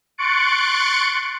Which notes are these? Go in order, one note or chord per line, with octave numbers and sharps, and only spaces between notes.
C6 C#6 F#6 A6 C#7 D7